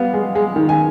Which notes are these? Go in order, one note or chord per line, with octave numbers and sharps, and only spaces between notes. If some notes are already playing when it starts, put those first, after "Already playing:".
Already playing: G3 B3 F5
G#3
G#3
D#3
G#5